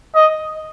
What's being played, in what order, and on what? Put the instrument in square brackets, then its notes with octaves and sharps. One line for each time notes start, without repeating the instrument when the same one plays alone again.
[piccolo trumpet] D#5